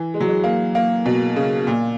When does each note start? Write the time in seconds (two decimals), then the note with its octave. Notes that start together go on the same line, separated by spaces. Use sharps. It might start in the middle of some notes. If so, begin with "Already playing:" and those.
Already playing: E3
0.14 G#3
0.20 F#3
0.28 G#3
0.44 A#3
0.75 A#3
1.06 B2
1.36 C#3
1.67 A#2